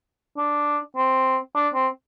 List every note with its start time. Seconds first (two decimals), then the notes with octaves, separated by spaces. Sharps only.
0.38 D4
0.97 C4
1.56 D4
1.74 C4